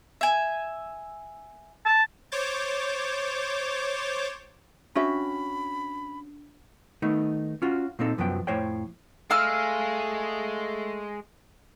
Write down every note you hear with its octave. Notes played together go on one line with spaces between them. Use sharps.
E5 G#5
A5
C5 C#5 D6 G6 A6
C#4 D4 F#4 E5 B5
D#3 A3 B3 D#4
C#4 F4 F#4
A#2 A#3 C4 D#4 A4
C2 F#2 F3 F#3 B3 G5
F2 A2 C5 C#5 G5
G#3 A3 G#4 F5 E6 F6